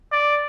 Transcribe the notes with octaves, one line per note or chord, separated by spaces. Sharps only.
D5